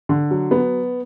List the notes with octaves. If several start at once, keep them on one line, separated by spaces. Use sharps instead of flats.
D3
F#3
B3